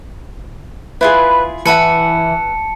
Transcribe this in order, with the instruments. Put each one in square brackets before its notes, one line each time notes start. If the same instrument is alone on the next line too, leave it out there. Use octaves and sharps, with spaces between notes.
[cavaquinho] E4 F4 G#4 [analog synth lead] B4
[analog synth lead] E3 [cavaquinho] B4 E5 F#5 [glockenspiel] A5 C#7